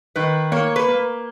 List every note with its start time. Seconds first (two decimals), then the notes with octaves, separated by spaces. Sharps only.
0.16 D#3 B4
0.52 A#3 C#5
0.76 B4
0.88 A#3